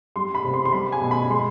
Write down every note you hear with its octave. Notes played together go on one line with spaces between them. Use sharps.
G3 C6
B5
C3
C6
C6
G3 B5
G#5
B2
B5
G#3 C6